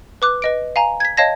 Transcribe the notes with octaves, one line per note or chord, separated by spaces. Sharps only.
B4 D6 F#6
B4 D#5 D7
F5 G#5 A#5
G#6 B6
C#5 D#5 F5 A5 G#6 A#6